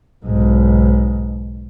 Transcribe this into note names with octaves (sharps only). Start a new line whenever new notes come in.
B1 G#2